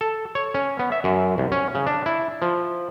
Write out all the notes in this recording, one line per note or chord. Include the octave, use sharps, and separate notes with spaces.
A4
C#5
C#4
B3
E5
F#2
C2
C#4
C#3
D4
E4
F3